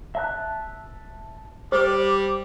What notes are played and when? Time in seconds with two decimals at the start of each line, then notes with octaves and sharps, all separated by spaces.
0.15 E5 A5 F#6
1.72 G3 C5 D6